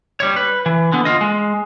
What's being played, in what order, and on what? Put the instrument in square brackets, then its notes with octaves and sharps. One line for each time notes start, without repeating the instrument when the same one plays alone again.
[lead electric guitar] G3 C#5
B4
E3
D3 B3
F4 D#5
G#3